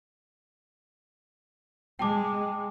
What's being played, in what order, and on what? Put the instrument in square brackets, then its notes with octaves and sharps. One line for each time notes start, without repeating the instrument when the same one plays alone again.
[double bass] G#3 [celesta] G5 A5 D6